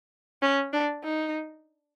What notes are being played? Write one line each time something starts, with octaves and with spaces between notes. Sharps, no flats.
C#4
D4
D#4